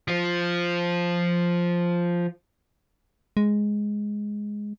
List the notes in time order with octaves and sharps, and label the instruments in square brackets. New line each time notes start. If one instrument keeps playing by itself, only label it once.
[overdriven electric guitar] F3 F4
[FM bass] G#3